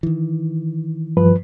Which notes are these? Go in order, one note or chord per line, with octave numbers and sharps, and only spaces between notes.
D#3 E3
G2 F3 B4